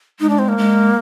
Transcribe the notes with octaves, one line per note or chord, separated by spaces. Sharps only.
G#3 D#4
D4
C4
A#3
G#3